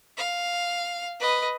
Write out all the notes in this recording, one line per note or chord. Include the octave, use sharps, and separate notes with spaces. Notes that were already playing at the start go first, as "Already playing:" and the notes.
F5
B4 D#5